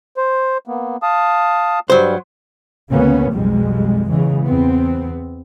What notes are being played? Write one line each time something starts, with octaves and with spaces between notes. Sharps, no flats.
C5
A#3 B3
F5 A5 D#6
G2 F#3 G3 C5
D2 C#3 A#3 B3 C#4
B1 F2 B2 G3 G#3
E2 C#3 E3 G#3
E2 B3 C4